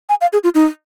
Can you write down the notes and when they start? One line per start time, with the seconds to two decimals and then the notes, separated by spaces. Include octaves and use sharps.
0.09 G#5
0.21 F5
0.33 G#4
0.44 F4
0.55 D#4